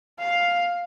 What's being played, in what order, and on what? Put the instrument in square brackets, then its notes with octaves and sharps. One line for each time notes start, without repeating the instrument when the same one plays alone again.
[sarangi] F5